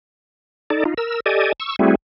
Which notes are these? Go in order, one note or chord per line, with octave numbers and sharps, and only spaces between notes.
D#4 A4 D5
D#4 F4
A#4 E6
G4 A4 D5 D#5 G#5
C#6 E6
G3 A3 C4 E4 F#4 G#4